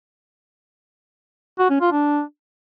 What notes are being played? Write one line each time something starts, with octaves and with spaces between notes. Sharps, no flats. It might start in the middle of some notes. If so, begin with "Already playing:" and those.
F#4
C#4
F4
D4